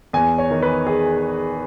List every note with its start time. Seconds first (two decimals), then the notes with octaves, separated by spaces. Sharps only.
0.13 E2 G#5
0.38 C#5
0.50 D#3
0.62 B4
0.87 G#4